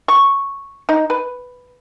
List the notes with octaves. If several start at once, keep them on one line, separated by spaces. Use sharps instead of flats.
C#6
D#4
B4